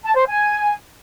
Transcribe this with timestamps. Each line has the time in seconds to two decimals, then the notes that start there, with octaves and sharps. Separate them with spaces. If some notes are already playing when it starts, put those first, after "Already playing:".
0.04 A5
0.16 C5
0.27 G#5